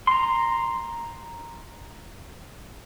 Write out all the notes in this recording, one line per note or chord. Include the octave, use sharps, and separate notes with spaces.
A#5 C6